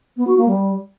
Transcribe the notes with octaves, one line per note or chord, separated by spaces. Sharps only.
B3
F#4
A#3
G3